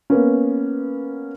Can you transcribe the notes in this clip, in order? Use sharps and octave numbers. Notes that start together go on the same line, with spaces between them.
A#3 B3 C#4